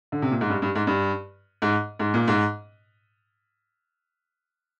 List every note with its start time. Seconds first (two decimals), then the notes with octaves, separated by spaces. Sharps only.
0.12 D3
0.22 C3
0.31 A#2
0.41 G#2
0.50 G2
0.62 G2
0.75 G#2
0.87 G2
1.62 G#2
1.99 G#2
2.14 A#2
2.28 G#2